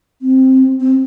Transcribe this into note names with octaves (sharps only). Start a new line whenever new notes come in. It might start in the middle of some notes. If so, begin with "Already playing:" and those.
C4
C4